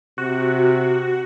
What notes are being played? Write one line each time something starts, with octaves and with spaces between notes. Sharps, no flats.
C3 F#4